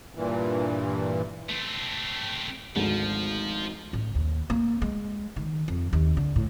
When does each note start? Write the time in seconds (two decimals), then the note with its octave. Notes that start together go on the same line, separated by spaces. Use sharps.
0.15 G2 A#2 E3
1.49 A3 C4
2.76 G#1 D2 G#2 F3
3.93 A1
4.15 D#2
4.50 A#3
4.82 G#3
5.36 D#3
5.68 F2
5.93 D#2
6.17 D3
6.36 A2